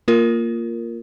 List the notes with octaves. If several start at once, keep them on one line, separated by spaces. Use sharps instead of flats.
A#3 F4 A#4